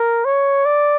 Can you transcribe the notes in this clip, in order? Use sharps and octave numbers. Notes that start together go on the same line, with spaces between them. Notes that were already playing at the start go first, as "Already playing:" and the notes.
Already playing: A#4
C#5
D5